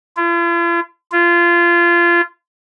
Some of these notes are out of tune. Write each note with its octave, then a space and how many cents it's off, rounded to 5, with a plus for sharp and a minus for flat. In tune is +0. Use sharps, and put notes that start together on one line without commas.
F4 -45
F4 -25